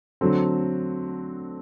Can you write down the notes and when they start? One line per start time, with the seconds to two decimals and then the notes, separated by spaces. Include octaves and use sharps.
0.21 D3 F#3 A3 C4